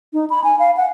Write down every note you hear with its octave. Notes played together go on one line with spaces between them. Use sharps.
D#4
B5
G#5
F5
F#5